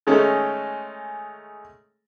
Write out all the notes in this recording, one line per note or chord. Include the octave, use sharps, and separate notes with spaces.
D#3 G#3 A3 C#4 D#4